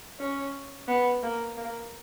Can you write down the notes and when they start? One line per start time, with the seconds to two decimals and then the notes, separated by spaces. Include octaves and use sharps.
0.19 C#4
0.88 B3
1.23 A#3
1.57 A#3